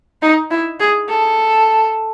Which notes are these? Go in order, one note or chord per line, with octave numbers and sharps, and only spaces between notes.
D#4
E4
G#4
A4